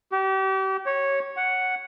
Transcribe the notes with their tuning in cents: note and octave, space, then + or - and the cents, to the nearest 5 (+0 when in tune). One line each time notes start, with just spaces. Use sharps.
G4 -35
C#5 -10
F#5 +0